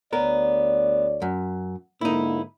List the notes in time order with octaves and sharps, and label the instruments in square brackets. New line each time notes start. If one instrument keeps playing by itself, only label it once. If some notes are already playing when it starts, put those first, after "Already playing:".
[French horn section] D2 C#5 D5 [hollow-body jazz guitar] B3 A#4
[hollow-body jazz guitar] F#2
[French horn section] G#2 D3 A#3 [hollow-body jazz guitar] D#4 E4